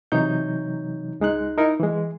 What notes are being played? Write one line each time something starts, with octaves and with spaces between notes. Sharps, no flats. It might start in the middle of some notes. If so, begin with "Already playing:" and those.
C3 E3 F#3 D#4 C#5 G6
C#2 G#3 D#4 F#6
D#4 E4 A#4
E3 G#3